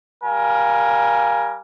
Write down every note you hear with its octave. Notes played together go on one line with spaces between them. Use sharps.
G3 A#4 F5 G#5